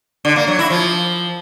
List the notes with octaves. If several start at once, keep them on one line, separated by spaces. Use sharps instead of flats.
D3
A#3
F#3
E4
F3